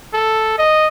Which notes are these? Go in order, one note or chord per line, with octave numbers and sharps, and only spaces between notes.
A4
D#5